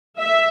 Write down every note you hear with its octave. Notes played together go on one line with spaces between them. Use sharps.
E5